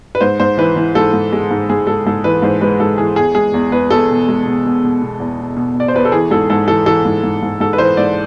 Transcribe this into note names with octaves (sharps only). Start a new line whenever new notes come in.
B4
G#2 C5
G#2 C5
E3 B4
E3
G#2 A4
G#2
G#3
G#2
G#2 G#4
G#2 A4
G#2 A4
E3 B4
G#2 C5
G#3 B4
G#2 A4
E3 G#4
E2 G#4
G#3 G#4
E2
E2 B4
E2 A4
B2
G#3
B2
B2
B2
B2
E2
B2
B2
B2 D5
C5
E2 B4
A4
E3 G#4
G#2 A4
G#2 A4
E3 A4
E3 A4
G#2
G#2
G#2
G#2 A4
B4
E3 C5
G#2 D5